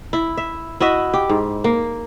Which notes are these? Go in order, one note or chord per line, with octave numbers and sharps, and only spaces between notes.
E4
E5
E4 F#4 D#5 E5
G4
G#2
A#3